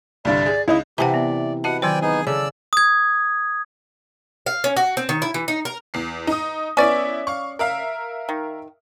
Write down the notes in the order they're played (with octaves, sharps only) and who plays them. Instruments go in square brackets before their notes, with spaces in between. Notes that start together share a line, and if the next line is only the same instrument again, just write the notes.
[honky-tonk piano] C2 G2 D3 [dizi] D5
[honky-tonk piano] G#4
[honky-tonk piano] C#2 D#4 D#5 [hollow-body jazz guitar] E4
[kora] C3 E3 [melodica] G4 [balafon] F#5 A5 A#5
[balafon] B3 [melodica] D5
[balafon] F#4 D#5 A5 [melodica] B4 [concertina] F#5
[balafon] D#3 F#3 C5 [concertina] D5 G5 G#5
[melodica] B3 D#4 [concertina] G#4 G#5
[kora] C#3 [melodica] A4 [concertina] D5 E6
[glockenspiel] D#6 G#6
[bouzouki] F5
C#4
F#4
C4
D#3
E4
E3
D#4
A#4
[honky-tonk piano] E2 C7
D#4 D#6
[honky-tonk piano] B3 E4 [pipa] C#4 D5
[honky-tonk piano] F5 C#6
A#4 E5 F5
[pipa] D#3